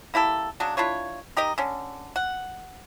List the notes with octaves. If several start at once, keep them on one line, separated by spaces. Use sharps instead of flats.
A#3 E4 G4 A4
C#3 F#3 D4
D4 E4 F4 C#5
D#4 G4 A#4 D#5
D3 C#4
F#5